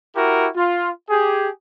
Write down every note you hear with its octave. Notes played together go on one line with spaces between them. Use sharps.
E4 F#4 G4 A#4
F4
G4 G#4